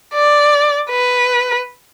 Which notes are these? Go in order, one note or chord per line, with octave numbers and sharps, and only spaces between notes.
D5
B4